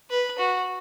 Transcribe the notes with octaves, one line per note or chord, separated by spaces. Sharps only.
B4
F#4